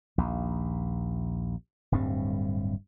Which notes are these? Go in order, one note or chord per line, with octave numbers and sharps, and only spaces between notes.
A#1 D#2
D1 G2 G3 C4